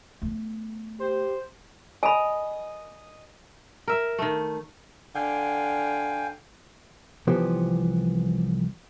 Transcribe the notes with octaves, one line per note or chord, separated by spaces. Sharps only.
A3 B3
G4 C5
D#5 G#5 B5
A#4 E5
D#3 A3
D3 F5 G5 G#5
C2 E3 F3 B3 G4 C5